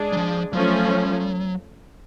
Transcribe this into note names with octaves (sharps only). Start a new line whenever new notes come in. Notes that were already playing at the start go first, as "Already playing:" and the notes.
Already playing: G#3 D4 G#4
F#3
F3
F3 F#3 A3 C#4